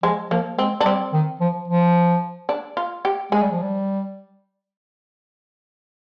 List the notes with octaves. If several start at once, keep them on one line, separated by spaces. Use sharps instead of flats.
F3 G#3
F3 A#3
G#3 C4
D4
G3 C4
D#3
F3
F3
D4
F4
G4
G#3 G#4
G3
F3
G3